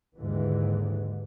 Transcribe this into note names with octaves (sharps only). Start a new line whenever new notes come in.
D#2 G#2 D3 E3